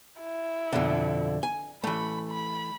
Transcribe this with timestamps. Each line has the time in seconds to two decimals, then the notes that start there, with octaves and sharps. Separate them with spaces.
0.20 E4
0.73 F2 B2 D3
1.43 G#5
1.84 E3 A3 B5
2.30 B5